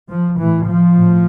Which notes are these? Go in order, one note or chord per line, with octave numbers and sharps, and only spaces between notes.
F3
A2 E3
F3
A2